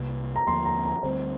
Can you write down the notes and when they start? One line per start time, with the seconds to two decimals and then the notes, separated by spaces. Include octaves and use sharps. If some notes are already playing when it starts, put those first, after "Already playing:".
Already playing: C2 C3 A#3
0.36 A#5
0.47 D#2 D3 F3 A#3 C6
0.65 A#5
0.85 A#5
1.03 D2 D3 G3 C4 C5